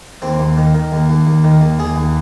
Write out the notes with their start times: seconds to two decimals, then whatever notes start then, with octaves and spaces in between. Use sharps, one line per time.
0.22 D#2 C4
0.39 D#2
0.57 D#3
0.75 D#3
0.92 D#2
1.09 D#2
1.27 D#2
1.44 D#3
1.61 D#2
1.79 D#2 G#4
1.96 D#2